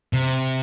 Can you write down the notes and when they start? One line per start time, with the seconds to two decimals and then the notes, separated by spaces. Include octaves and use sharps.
0.13 C3